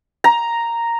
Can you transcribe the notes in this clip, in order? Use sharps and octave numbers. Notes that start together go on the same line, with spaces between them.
A#5